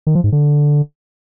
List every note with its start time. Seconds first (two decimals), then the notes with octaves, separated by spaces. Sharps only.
0.07 D#3
0.15 F3
0.24 G#2
0.32 D3